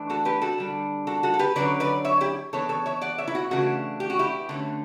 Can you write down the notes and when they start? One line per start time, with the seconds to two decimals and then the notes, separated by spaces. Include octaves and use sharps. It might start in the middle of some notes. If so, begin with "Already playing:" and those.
Already playing: E3 A3 D4
0.10 F#4 A4
0.25 G4 B4
0.42 F#4 A4
0.58 D3 G3 D4
1.07 F#4 A4
1.23 F#4 A4
1.34 A4
1.39 G4 B4
1.55 D3 F#3 C#4 B4 D5
1.80 B4 D5
2.05 C#5 E5
2.21 E4 G4
2.53 E3 B3 D4 A4 C#5
2.69 A4 C#5
2.86 C#5 E5
3.01 D5 F#5
3.18 C#5 E5
3.28 E4
3.35 F#4
3.51 C#3 E3 A3 D4 F#4
4.00 G4
4.10 F#4
4.19 E4 G4
4.49 D3 A3 C#4